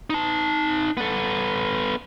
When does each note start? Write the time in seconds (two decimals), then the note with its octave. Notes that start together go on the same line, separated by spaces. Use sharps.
0.10 D#4 A5
0.97 B3 A4